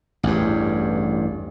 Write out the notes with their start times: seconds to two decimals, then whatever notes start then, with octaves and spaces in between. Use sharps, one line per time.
0.23 A1 E2 G2